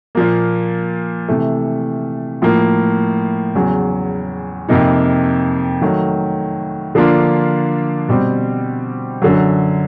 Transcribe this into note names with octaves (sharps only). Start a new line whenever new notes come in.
A#2 F3 A#3
C3 E3 A3
A2 F3 A#3
E2 C#3 F#3
F2 C3 F3 A#3 D#4
D#3 F#3 A3
D3 F3 A#3 D4 F4
B2 G3 C4
F#2 D3 F#3